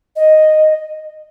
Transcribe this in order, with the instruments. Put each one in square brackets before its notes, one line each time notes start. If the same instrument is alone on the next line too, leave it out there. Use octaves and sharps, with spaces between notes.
[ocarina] D#5